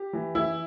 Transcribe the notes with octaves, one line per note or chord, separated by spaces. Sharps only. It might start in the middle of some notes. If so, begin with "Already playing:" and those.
Already playing: G4
E3
E3 E4